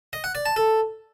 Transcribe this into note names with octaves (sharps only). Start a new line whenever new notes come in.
D#5
F#5
D5
A5
A4